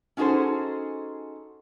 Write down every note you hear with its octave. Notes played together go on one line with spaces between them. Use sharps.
C#4 D#4 F#4 G#4 A4 C5